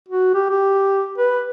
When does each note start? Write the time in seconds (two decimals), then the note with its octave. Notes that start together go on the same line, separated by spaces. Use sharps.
0.09 F#4
0.34 G4
0.50 G4
1.18 B4